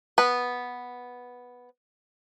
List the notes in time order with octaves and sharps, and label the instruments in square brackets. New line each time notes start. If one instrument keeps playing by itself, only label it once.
[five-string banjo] B3 B4